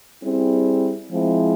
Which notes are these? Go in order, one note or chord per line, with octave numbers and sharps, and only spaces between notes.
G3 C4 E4 G#4
F3 G#3 C4 E4